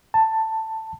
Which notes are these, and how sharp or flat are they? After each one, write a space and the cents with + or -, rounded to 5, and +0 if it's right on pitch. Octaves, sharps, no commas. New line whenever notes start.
A5 +10